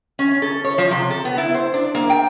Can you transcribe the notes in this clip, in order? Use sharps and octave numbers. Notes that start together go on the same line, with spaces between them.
C#4
A4
C#5
F3
C3
A4
B3
E4
C5
D4
A#3
G5